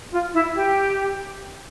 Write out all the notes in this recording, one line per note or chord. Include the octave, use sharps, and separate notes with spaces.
F4
E4
G4